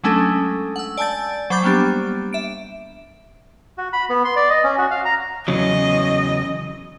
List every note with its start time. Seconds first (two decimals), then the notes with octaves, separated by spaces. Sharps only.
0.04 F#3 G#3 A3 C#4 D4 A4
0.76 F#5 E6
0.97 D5 G#5 A5 E6 G6 A6
1.50 F#3 C5 B5 D6 G6 A6
1.63 G3 A#3 B3 D4 G4
2.33 E5 D7
3.78 F#4
3.93 B5
4.10 B3
4.25 C6
4.36 D5
4.50 D#5
4.64 C#4
4.78 F#4
4.91 F5
5.05 A#5
5.48 E2 C#3 F#3 D#5